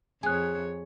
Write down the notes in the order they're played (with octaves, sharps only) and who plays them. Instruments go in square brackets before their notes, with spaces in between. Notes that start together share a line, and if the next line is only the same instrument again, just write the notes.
[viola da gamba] F2 C#5 [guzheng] G#4 [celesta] G#5 F#6